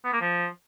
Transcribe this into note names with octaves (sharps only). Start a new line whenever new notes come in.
B3
A#3
F3